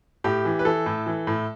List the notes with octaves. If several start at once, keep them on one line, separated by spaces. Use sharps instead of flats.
A2 G4
E3
B4
E3 A4
A2
E3
A2